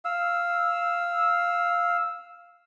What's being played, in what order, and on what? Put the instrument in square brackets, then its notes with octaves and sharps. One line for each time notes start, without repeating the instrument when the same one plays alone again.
[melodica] F5 E6